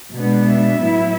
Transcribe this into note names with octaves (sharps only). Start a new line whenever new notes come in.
B2 G#3 B3 D4
E5
A2 F#3 B3 E4